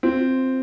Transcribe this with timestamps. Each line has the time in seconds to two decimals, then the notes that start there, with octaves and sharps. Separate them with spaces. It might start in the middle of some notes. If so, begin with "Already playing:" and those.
0.03 C4 F4